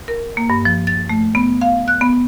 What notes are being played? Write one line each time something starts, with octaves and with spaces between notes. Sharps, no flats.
A#4
A#3
G2
F3
A6
A3
B3
F5
F#6
B3